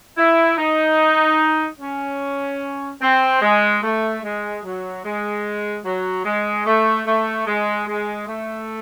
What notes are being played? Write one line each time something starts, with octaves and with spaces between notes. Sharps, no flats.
E4
D#4
C#4
C4
G#3
A3
G#3
F#3
G#3
F#3
G#3
A3
A3
G#3
G#3
A3